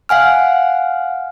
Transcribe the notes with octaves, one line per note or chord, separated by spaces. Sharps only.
F5 F#5 G#5 F6